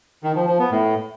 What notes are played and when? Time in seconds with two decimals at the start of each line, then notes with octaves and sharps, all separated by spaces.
0.24 D#3
0.35 F3
0.47 F3
0.59 B3
0.71 A2